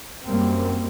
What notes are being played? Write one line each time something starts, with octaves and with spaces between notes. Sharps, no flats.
F#2 G3 A#3 C4